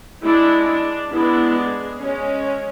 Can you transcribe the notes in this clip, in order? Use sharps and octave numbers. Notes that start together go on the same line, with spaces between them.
G#3 D4 E4
D4
G#3 B3 D4 E4
G#4
G#3 C#4